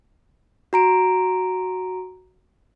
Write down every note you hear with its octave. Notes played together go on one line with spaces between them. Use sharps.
F#4 A#5 D7